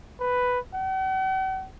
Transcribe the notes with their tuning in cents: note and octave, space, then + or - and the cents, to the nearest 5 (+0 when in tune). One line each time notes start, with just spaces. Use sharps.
B4 +5
F#5 +45